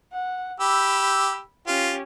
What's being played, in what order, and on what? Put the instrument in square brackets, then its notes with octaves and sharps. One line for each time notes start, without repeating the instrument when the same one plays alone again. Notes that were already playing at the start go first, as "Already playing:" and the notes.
[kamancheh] F#5
[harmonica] G4 E6 [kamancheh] B5
[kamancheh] C#4 G4 [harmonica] F4